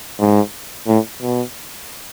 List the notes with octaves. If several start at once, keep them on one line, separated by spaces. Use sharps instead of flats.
G#2
A2
B2